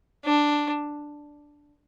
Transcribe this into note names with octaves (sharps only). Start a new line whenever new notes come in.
D4